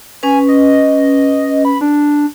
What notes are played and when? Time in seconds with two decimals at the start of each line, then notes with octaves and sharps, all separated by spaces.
0.23 C#4 B4 G#5
0.48 D#5
1.65 B5
1.81 D4